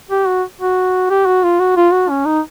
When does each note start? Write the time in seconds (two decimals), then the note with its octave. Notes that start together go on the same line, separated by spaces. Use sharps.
0.11 G4
0.28 F#4
0.61 F#4
1.10 G4
1.26 F#4
1.43 F4
1.59 F#4
1.76 F4
1.92 F#4
2.09 C#4
2.25 D#4